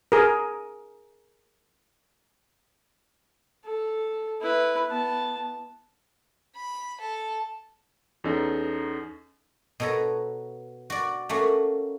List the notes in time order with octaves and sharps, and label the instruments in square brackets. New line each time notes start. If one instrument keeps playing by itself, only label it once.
[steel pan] G#4 A#4
[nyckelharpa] A4
E4 B4
B3 A5
[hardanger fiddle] B5
A4
[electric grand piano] E2 C#4 D#4 A4
[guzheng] B2 B3 A4 C#5 A#5
F#4 D5
A3 A#3 C#4 F#4